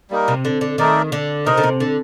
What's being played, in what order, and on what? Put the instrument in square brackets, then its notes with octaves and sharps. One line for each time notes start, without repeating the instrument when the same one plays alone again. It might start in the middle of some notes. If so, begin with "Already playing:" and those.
[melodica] G3 A#3 D#4 A#4
[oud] C3
D3
D3
[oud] D#3 [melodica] A3 D#4 A#4 D5
[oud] D3
[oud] C3 [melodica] D#4 A#4 D#5
[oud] D3
C3
D3